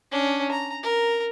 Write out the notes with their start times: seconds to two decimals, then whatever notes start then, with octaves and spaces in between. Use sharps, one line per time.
0.11 C#4 D4
0.51 A#5
0.83 A#4